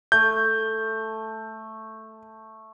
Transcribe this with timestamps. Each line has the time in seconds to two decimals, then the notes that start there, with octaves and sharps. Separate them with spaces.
0.12 A3 G6